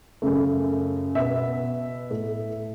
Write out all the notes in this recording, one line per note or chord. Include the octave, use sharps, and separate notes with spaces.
F#2 C#3 A3
B2 B3 E5
A2 A3